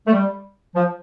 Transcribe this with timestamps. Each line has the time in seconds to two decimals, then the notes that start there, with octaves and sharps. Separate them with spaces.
0.07 A3
0.12 G3
0.75 F3